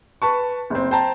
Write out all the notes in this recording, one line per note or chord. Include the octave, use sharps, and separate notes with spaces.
B4 A5 C#6
F#1 C4
C5 G5 A5 A#5